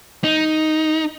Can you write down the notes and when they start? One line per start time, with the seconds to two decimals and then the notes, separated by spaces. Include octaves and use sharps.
0.24 D#4